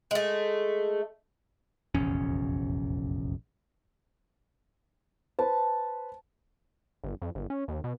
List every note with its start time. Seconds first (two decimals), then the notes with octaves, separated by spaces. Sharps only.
0.11 G#3 A3
1.94 F1 A#1 E2 C#4
5.39 B4 C5 A5
7.04 G1
7.22 F2
7.35 G1
7.50 C#4
7.68 D#2
7.84 B2